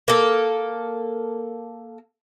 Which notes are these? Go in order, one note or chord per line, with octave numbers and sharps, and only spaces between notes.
A#3 A4